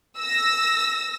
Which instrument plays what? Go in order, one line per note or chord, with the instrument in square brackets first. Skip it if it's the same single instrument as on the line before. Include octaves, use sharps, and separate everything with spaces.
[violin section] E6 A#6